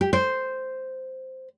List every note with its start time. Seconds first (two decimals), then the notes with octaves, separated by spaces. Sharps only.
0.01 G4
0.13 C5